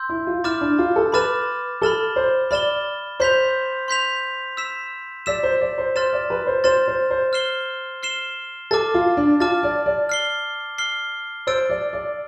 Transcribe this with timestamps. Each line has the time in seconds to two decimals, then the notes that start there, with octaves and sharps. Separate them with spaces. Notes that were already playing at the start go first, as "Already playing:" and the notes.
Already playing: C6 E6 G6
0.09 E4
0.27 F4
0.44 E4 B5 D6 F6 A6 E7
0.61 D4
0.78 F4
0.96 A4
1.12 B4 B5 D6 F6 A6 E7
1.82 A4 B5 F6 A6 E7 G7
2.16 C5
2.51 D5 B5 F6 A6 E7 G7
3.20 C5 C6 G6 B6 F7
3.88 C6 G6 B6 F7
4.57 E6 B6 E7
5.26 D5 E6 B6 E7
5.43 C5
5.61 D5
5.78 C5
5.95 C5 C6 F6 A6 E7
6.13 D5
6.30 B4
6.47 C5
6.64 C5 C6 F6 A6 E7
6.88 C5
7.11 C5
7.33 F6 C7 E7 G7
8.03 F6 C7 E7 G7
8.71 A4 A5 D6 F6 A6
8.94 F4
9.17 D4
9.40 F4 A5 D6 F6 A6
9.63 D5
9.86 D5
10.09 F6 C7 G7
10.78 F6 C7 G7
11.47 C5 E6 A6 D7
11.70 D5
11.93 D5